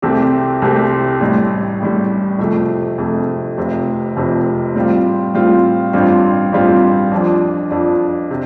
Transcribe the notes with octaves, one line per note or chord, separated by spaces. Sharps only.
C2 C3 A3 C4 G4
C2 C3 A3 C4 G4
A1 A2 G3
A1 A2 G3
F2 C3 A3
F2 C3 A3
F1 F2 C3
F1 F2 C3
A2 G3 C4 F4
A2 G3 C4 F4
A1 G2 G3 C4 F4
A1 G2 G3 C4 F4
F2 F3 D4
F2 F3 D4
C3